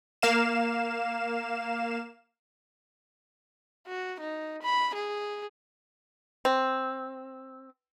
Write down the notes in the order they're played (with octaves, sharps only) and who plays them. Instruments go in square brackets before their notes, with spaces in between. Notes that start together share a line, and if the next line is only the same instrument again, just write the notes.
[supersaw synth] A#3 F5 E7
[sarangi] F#4
D#4
B5
G#4
[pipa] C4